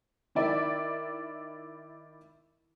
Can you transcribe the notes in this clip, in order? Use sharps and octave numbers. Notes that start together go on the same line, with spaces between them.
D#3 E4 D5 E5